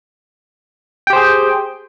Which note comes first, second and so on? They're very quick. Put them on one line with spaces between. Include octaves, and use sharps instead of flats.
G5 G4 C5 G#4